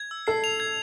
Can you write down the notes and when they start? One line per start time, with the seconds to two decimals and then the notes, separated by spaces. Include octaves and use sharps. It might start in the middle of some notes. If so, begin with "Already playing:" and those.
Already playing: G#6
0.11 E6
0.27 A4 C7
0.44 F7
0.60 G#6